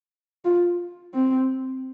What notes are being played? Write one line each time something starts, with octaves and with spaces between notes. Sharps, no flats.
F4
C4